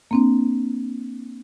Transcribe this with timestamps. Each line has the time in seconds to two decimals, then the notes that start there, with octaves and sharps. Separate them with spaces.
0.11 A#3 C4 D4